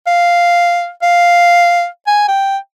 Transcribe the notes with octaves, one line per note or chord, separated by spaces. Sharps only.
F5
F5
G#5
G5